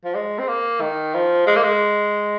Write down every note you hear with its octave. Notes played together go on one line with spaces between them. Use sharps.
F3
G#3
C4
A#3
D#3
F3
G#3
A#3
G#3